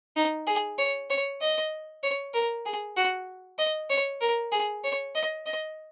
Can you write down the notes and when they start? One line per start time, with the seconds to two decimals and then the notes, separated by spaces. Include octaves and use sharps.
0.16 D#4
0.47 G#4
0.78 C#5
1.10 C#5
1.41 D#5
2.03 C#5
2.34 A#4
2.65 G#4
2.97 F#4
3.59 D#5
3.90 C#5
4.21 A#4
4.52 G#4
4.84 C#5
5.15 D#5
5.46 D#5